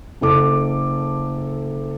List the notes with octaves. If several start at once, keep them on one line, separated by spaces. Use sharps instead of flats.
F#1 A4 D6